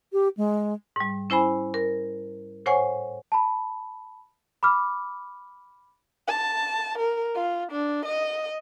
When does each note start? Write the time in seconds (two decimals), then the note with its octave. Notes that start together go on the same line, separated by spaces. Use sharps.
0.13 G4
0.37 G#3
0.96 G#2 G3
1.30 C#4 E4 C5 G#5 B5
1.74 A#4
2.66 A2 C5 C#5 F#5 G#5 C#6
3.32 A5 B5
4.63 B5 D6 F6
6.28 A5
6.98 A#4
7.36 F4
7.72 D4
8.06 D#5